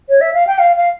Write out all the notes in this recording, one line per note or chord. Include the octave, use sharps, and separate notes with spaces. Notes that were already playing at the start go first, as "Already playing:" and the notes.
C#5
E5
F5
G5
F5
F5